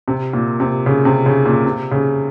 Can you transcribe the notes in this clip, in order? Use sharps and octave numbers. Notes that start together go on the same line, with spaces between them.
C3
A#2
C3
C#3
C3
C#3
A#2
C3
C#3